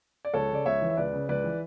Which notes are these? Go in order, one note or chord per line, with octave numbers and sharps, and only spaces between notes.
D5
C#2 A4 C#5
C#3 D5
C#2 C#5 E5
E3
E5
C#2 B4 D5
C#3
C#2 B4 D5
E3